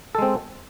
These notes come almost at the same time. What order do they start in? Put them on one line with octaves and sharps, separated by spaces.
A4 G#3 C4